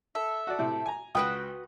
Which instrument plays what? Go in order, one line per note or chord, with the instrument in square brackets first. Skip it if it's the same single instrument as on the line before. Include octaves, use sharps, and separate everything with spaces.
[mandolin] A4 E5
[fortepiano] F#4 D5
A2 C3
G#5 A#5
[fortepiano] C#2 G5 [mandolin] F#4 B4 D#6